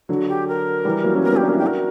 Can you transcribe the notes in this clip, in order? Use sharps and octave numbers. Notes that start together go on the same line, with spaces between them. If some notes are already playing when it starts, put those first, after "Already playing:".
D3 F#3 F#4
G4
A#4
E3 G3
F#3 A#3
C#4
G3 B3 A#4
A#3 C#4
G4
B3 D4
C#4 E4 A#4
D4 F#4 G4
A#4